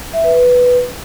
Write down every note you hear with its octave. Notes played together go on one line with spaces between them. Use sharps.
E5
B4
B4